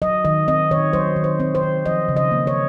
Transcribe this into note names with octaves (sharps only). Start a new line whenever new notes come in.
F#3 D#5
D#3 D#5
C4 D#5
D#3 C#5
F#3 C5
D#3
C5
C4
C5
D#3
F3 D#5
C#3
D#5
A#3
C#5